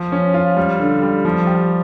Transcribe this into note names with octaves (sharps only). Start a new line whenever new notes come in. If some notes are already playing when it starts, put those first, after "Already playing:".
Already playing: F3
C#4
F4
G3
D3
G3
F3
G4